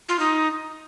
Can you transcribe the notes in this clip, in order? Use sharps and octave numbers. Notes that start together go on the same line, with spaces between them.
F4
D#4